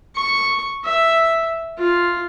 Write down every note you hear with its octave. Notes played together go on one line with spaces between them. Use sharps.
C#6
E5
F4